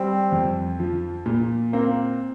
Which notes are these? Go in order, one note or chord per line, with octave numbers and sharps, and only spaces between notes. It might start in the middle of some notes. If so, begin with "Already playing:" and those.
Already playing: G3 C4
F2
F3
A#2
A#3 C4